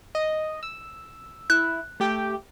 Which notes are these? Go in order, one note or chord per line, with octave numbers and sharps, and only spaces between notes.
D#5
E6
E4 F#6
A3 G4 G5